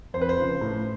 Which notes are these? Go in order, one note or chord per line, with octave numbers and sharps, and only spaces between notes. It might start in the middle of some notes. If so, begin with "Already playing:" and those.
F2 C5
B4
C5
C#3 F3
A2